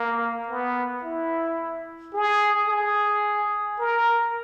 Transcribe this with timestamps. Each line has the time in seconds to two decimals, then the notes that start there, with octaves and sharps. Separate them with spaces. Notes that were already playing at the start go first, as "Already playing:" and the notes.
Already playing: A#3
0.48 B3
1.03 E4
2.14 G#4
2.69 G#4
3.79 A#4